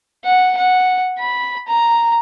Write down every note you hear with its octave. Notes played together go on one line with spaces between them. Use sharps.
F#5
F#5
B5
A#5